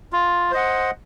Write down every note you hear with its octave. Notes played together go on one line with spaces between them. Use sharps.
F4
C5 D#5 F#5